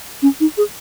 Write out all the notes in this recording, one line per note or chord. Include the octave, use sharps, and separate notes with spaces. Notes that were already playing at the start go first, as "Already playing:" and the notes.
C#4
D#4
G#4